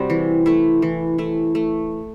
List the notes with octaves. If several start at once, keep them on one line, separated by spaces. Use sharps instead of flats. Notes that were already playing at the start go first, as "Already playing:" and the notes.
Already playing: C3 G3 C4 F#4
E3
A3 E4
E3
A3 E4
A3